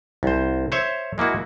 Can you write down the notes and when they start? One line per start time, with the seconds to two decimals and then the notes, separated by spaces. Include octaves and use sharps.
0.23 C2 C5
0.72 C5 C#5 E5
1.18 G#3 A#3 E4 F#4